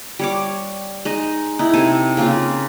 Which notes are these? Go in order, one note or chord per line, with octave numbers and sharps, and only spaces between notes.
G3 C#5 D6
G#3 D#4 D#5
D#4 E4
C3 A4 G#5 A5
C#3 A#3 C4 F4